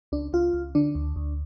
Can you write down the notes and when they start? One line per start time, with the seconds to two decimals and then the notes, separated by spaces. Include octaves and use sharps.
0.12 C#2 D4
0.33 C#2 F4
0.53 C#2
0.75 D3 D4
0.95 D2
1.16 D2